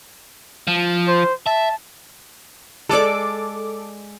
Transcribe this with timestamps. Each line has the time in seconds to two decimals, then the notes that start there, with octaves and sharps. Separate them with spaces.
0.67 F3
1.08 C5
1.46 E5 A5
2.89 G#3 A4 D5 D6